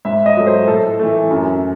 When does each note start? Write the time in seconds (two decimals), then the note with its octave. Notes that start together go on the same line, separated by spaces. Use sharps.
0.05 G#2 E5
0.26 D#5
0.37 F#3 A3
0.47 C5
0.68 A2 A4
0.99 E3 A3
1.30 F#2